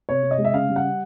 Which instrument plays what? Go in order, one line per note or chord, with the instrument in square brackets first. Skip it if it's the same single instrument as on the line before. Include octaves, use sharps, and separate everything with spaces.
[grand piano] C3 C#5
C3
D#5
G#3
E5
C#3 F5
G3
F#5